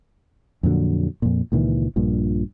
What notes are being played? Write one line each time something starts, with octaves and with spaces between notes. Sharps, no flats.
F2 A#2 D3 F#3
F2 A#2
C#2 A#2 D#3 E3
A#1 G2 A#2